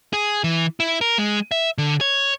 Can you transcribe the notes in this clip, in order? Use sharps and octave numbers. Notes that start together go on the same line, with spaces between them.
G#4
E3
E4
A#4
G#3
E5
D3
C#5